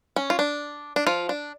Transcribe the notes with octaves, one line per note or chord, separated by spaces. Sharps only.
C#4
F4
D4
D4
F3 F4
D4